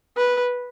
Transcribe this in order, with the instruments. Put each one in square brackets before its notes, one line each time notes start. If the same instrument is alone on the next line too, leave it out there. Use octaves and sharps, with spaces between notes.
[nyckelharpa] B4